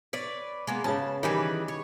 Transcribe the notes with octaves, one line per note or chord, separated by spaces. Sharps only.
B4 C#5 D5
G#3 A#3 B3
C#3 B3 C#4 A5
D#3 E3 G3 G4 G#4 B4
C#5